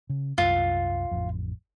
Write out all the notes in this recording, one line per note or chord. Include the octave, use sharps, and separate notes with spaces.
C#3
C2 F#2 F4
A1 F2